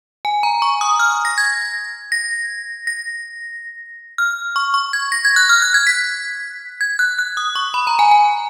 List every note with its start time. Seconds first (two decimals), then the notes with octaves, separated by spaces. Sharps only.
0.25 G#5
0.43 A#5
0.62 C#6
0.81 D#6
0.99 F6
1.25 A#6
1.38 G#6
2.12 A#6
2.87 A#6
4.18 F6
4.56 C#6
4.74 C#6
4.93 G#6
5.12 A#6
5.25 G#6
5.36 F#6
5.49 F6
5.62 F#6
5.74 G#6
5.87 B6
6.81 G#6
6.99 F#6
7.19 F#6
7.37 D#6
7.55 C#6
7.74 B5
7.87 A#5
7.99 G#5
8.11 G#5